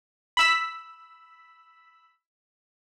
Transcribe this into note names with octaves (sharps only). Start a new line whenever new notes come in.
B5 E6 B6